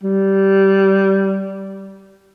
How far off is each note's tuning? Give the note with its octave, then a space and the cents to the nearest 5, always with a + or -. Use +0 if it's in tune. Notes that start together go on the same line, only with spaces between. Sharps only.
G3 -15